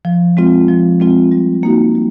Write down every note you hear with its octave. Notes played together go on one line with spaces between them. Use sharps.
F3
G#3 C4 F4
F3
G#3 C4 F4
G3
A#3 D#4 F#4
G3